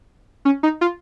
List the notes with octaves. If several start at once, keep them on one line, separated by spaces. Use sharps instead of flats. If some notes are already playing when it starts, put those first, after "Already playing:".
C#4
D#4
F4